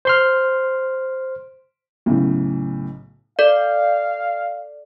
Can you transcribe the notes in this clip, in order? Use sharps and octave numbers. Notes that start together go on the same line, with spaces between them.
C5 C6 F6
B1 A2 C#3
A4 D5 F5